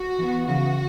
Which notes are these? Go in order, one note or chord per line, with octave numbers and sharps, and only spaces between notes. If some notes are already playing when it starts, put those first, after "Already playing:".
Already playing: F#4
E3 B3
C#3 E3 B3 F#4